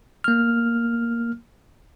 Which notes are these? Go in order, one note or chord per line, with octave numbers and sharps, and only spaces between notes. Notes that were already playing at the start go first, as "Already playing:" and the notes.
A#3 F6